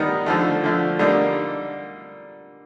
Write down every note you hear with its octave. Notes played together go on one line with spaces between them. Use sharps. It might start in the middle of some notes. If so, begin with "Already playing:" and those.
Already playing: D#3 G3 B3 D#4
D3 F3 A3
D3 F3 A3
D3 G3 A#3 D#4